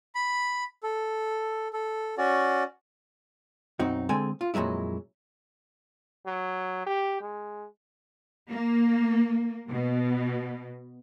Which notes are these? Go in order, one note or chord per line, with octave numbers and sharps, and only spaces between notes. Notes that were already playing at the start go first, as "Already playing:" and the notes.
B5
A4
A4
C#4 F#4 D5
B1 F#2 C4 D#4 F#4
D3 G#3 C4 A4 G#5
F4
F2 A#2 F#3 G#3 E4
F#3
G4
G#3
A#3
B2